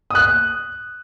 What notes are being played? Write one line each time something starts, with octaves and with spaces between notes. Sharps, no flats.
D#6 F#6